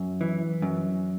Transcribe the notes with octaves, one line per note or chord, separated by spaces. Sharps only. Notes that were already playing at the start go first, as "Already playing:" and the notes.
Already playing: F#2
E3
F#2